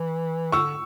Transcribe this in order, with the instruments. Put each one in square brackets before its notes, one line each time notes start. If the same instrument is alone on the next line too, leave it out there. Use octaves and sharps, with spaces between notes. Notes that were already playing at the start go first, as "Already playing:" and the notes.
Already playing: [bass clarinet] E3
[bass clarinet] D3 [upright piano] C#6 E6